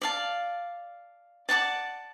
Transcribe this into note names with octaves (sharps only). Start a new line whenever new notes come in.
D5 F5 A5
D5 F#5 A5 D6